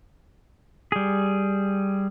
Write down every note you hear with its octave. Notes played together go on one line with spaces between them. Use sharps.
G3 G#4